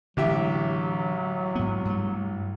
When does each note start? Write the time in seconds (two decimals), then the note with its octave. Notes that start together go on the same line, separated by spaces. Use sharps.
0.17 A1 D3 E3 F#3 G#3 G4 E5
1.55 G#2 B3
1.85 G2 A3